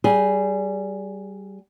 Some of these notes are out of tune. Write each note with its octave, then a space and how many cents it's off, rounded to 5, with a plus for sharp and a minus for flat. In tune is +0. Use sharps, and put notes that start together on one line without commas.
G3 -20 G#4 +0